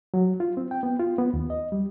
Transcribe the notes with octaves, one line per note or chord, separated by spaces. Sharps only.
F#3
F4
C4
G5
B3
F4
B3
D#2
D#5
G3